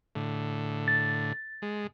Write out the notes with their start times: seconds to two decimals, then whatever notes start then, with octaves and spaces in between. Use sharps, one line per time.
0.15 A2 D3
0.88 A6
1.62 G#3